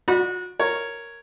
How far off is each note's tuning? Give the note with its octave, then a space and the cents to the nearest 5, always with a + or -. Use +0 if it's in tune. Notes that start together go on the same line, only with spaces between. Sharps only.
F#4 -30 D5 +10 B5 -30
A#4 -5 C#5 +0